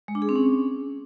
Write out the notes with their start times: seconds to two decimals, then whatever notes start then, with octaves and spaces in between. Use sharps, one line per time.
0.08 G#3
0.15 D4
0.22 G#4
0.29 C4
0.36 C#4